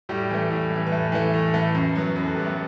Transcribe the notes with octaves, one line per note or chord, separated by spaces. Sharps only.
A2 G3 G4
E3 A3
A2
E3 A3
B4
A2 A3 A4
E3 A3
A2
E3 A3
F#2
F#3 B3
F#2 B4
A4
F#3 B3 G4
A3 A4